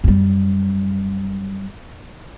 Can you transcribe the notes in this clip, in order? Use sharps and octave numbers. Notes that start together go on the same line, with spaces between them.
F#2 G3